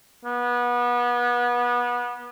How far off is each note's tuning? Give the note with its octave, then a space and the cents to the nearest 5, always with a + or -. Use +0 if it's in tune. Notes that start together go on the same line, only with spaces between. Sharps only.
B3 -25